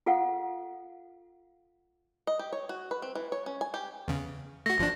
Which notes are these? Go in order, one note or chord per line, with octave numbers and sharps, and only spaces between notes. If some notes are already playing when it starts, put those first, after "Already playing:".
F4 A4 F5 F#5
D#5
G4
C#5
F#4
B4
C4
E3
C#5
C#4
G#5
G4
E2 C#3
A3 F#4 A#6
G1 F3 D4